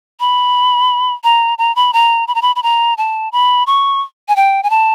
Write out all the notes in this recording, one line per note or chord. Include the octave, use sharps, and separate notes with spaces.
B5
A#5
A#5
B5
A#5
B5
A#5
B5
B5
A#5
A5
B5
C#6
G#5
G5
G#5
A5